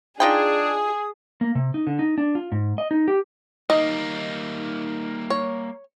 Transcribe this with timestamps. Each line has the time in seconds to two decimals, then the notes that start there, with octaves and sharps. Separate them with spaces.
0.20 D4 D#4 F4 G#4 G5 D#6
1.41 A#3
1.55 C3
1.74 D#4
1.87 D3
1.99 D#4
2.18 D4
2.35 F4
2.52 G#2
2.78 D#5
2.91 D#4
3.08 G4
3.70 G3 A#3 D#4 D#5
5.30 C#5